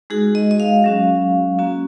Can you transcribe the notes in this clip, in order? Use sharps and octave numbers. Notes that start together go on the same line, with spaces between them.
G#3 D#4 F#4 G#4
D#5
D#5
F5
F#3 C#4 F#4
A#3 C#4 F#4